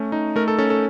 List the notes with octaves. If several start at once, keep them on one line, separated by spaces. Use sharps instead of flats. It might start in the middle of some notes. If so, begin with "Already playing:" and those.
Already playing: A3 C#4
D#4
A3 A#4
A4
C#4 A4
A4